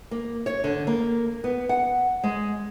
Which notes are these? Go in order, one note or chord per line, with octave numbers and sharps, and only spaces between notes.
A#3
C#5
D3
A#3
B3
F#5
G#3